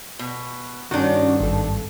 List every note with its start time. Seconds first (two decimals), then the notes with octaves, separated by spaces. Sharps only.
0.19 B2
0.91 G2 D#3 C#4 D4 F#4
1.40 G#1 A4